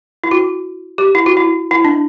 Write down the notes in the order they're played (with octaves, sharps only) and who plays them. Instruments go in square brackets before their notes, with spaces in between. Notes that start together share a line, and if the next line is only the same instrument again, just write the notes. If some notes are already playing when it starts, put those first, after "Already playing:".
[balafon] E4
F#4
G4
E4
F#4
E4
E4
D4